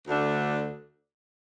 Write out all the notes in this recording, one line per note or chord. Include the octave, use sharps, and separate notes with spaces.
D2 D3 A3 D4